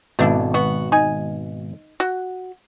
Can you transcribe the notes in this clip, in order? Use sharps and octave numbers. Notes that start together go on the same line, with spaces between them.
G#1 B2 A3 D4 E4
B3 F#4
D#4 G#5
F#4